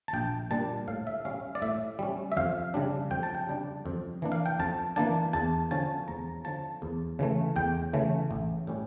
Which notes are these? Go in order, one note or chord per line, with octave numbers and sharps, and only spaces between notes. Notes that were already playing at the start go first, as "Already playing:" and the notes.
A5
A#1 G5
A#2 G3 D4 A5
A2 F5
E5
G3 C#4 F5
D5
A2 E5
G3 C#4
E5
F2 F5
C#3 G3 D4
F2 G5
A5
G5
C#3 G3 D4
F2
E3 A#3 D4
F5
G5
F2 A5
E3 A#3 D4 A5
E2 A5
D3 F3 C#4 A5
E2 A#5
D3 F3 C#4 A5
E2
C#3 E3 A3
E2 G5
C#3 E3 A3
A1
A2 G3 C#4